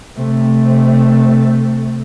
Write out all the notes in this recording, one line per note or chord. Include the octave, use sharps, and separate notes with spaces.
C3 A3